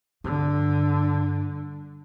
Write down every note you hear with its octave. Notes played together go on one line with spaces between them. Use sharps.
G2 D3